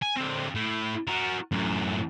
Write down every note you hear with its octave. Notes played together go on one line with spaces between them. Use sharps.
G#5
D3 C4
A2
F#4 A#4
F#2 A2